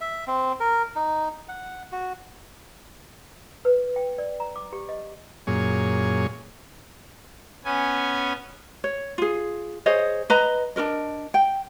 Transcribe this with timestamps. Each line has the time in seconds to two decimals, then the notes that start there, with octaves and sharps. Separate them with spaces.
0.01 E5
0.27 C4
0.60 A#4
0.96 D#4
1.49 F#5
1.92 F#4
3.65 B4
3.96 G5
4.18 D5
4.40 A#5
4.56 D6
4.73 G4
4.89 D#5
5.47 F#2 A#2 G#4 C#5
7.65 B3 C#4 G#5
8.84 C#5
9.18 F4 G#4
9.86 G#4 C5 C#5 D#5
10.30 B4 D#5 A#5
10.76 D4 F#4 A#4 D#5
11.34 G5